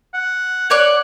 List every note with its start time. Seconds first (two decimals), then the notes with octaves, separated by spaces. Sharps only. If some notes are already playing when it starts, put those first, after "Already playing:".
0.14 F#5
0.70 C#5 D5 F#6